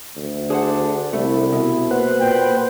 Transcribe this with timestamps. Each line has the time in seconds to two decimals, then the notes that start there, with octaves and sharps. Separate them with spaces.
0.16 D2
0.50 D4 G#4 C5 F#5
1.13 C2 A3 E4
1.53 B2
1.91 A#3 B4 C5 F#5
2.20 A#2 G5